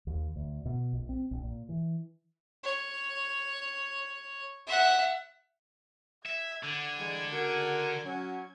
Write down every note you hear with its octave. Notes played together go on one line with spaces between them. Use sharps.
D#2
D2
B2
A#1
C4
A#1
A#2
E3
C#5
E5 F#5
E5 G#6
D3
E3 G3 G#3
C#3 F#4 A#4
F#3 C#4